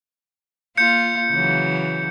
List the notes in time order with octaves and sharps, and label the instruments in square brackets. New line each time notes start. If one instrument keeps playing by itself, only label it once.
[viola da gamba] A#3 F4 [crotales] G6 C#7
[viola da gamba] C#3 E3 F#3